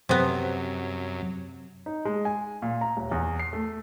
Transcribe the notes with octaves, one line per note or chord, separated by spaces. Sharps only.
F#2 C3 B3
D#4
G#3
G#5
A#2
A#5
D#1
E2
C7
A3